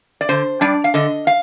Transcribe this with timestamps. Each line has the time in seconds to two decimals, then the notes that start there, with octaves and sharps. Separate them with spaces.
0.21 D5
0.29 D3 C5
0.61 G3 D4 D5
0.84 F5
0.94 D3 D#5
1.27 F5